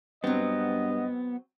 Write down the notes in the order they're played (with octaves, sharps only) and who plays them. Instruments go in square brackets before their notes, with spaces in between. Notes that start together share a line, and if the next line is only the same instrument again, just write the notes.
[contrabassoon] G2 [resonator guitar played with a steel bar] F#3 C4 [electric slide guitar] B3 [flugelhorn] D#5